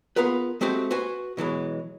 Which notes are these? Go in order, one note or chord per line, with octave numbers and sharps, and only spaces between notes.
B3 F4 G#4 A#4 B4
G#3 A3 C4 F#4 G4
F#4 B4 C5 G#5
B2 E3 F#3 G#3